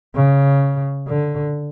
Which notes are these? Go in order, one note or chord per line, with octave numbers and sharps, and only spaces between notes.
C#3
D3